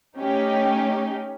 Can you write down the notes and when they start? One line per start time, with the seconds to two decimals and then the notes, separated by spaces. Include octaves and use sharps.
0.18 A3 C#4 D#4 G4